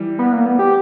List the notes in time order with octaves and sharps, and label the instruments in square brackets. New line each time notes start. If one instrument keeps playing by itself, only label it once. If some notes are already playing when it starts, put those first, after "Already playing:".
Already playing: [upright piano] E3 G3
[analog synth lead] B3
A#3
B3
G4